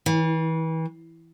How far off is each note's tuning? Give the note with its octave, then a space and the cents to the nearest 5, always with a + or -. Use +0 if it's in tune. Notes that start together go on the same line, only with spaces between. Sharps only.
E3 -35